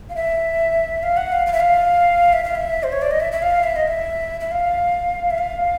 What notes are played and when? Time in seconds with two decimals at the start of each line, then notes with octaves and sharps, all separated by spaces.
0.09 F5
0.15 E5
1.03 F5
1.17 F#5
1.32 F5
1.47 F5
1.53 E5
1.60 F5
2.33 E5
2.44 F5
2.55 E5
2.83 C5
2.92 C#5
3.02 D5
3.11 D#5
3.20 E5
3.32 E5
3.42 F5
3.63 E5
3.76 D#5
3.88 E5
4.40 E5
4.51 F5
5.30 E5
5.38 F5